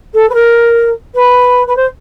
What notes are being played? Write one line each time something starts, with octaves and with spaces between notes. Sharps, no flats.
A4
B4
A#4
B4
B4
C5